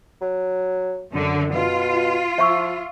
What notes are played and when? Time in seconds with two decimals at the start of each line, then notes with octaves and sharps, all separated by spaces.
0.22 F#3
1.13 F#2 D3
1.54 B2 F4
2.38 F3 E5 C#6 E6